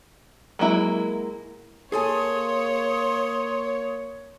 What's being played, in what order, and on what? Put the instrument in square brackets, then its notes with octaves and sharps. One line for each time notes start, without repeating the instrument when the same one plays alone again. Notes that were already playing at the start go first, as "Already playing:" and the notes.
[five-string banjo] F#3 G#3 A#3 E4
[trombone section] A#3 [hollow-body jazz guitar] G#4 A4 G#5 [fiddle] C#5 [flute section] C6 D#6